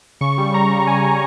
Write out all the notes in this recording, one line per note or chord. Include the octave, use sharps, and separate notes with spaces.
C#3 C#6
G3
G3 A#5
C#3
G3 G#5
C#3